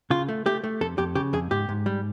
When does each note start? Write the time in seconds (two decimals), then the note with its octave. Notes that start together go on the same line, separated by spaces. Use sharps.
0.10 C#3 F4
0.29 A3
0.46 A3 G4
0.64 A3
0.81 F2 A4
0.98 F2 G4
1.15 C#3 G4
1.33 F2 G#4
1.51 G#2 G4
1.69 G#2
1.86 G3